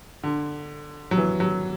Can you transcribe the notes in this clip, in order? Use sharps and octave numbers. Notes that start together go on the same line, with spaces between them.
D3
F#3
E3
F#3